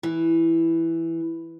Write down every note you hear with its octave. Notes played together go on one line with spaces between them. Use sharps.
E3